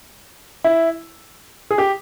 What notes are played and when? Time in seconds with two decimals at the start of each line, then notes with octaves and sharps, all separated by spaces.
0.64 E4
1.71 G#4
1.78 G4